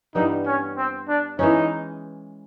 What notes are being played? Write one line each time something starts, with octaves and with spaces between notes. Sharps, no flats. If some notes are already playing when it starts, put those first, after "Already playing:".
G2 E3 G3 B3 D#4
C#4
C4
D4
E3 G#3 C#4 D#4